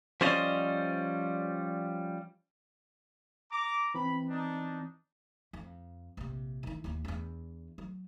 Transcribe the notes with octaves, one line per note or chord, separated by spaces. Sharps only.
F3 G3 C#4 C5 D5 D#5
A#5 D6
E3 C4 B5
D4 D#4
F2
A#1 C3
D#3 E4
D#2 E3
E2 D4
F#3